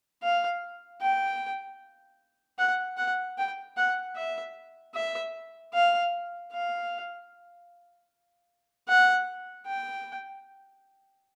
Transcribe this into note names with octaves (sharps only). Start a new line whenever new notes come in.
F5
G5
F#5
F#5
G5
F#5
E5
E5
F5
F5
F#5
G5